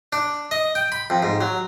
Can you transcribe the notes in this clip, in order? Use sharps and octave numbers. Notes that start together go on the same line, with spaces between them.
D4
D#5
G5
B5
F2
G#2
F#3